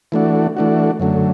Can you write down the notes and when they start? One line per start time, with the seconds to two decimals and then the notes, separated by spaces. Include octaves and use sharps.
0.12 E3 A3 D4 F#4
0.57 E3 A3 D4 F#4
1.00 F#2 D3 F#3 A3